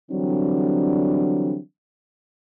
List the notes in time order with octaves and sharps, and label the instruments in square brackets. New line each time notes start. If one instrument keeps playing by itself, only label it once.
[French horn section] D3 E3 F#3 G3 C4 D4